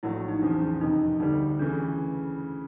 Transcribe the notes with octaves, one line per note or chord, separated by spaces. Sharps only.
A#1 A2 F#3 E4
D#4
E2 C#3 F3 D4
D4
F2 C3 D#3 D#4
D2 D3 G3 D#4
C#3 E3 A3 D4